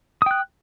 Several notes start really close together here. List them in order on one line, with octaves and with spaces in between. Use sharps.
D#6 G5 F#6